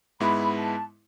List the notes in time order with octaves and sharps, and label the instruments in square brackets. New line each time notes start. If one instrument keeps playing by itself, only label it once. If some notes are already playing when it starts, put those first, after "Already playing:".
[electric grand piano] G#2 G#3 B3 E4 [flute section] B5
[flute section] A5